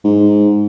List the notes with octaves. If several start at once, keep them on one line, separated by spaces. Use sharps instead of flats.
G#2